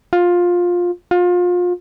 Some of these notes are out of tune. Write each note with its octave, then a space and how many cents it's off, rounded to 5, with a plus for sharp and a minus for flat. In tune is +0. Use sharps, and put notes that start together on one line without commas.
F4 +15
F4 +30